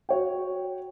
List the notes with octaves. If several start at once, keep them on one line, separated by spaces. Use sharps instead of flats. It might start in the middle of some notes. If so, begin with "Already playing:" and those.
F#4 C#5 G5